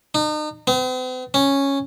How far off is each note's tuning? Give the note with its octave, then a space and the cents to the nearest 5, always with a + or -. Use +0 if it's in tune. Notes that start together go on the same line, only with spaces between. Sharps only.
D#4 -40
C4 -45
C#4 -5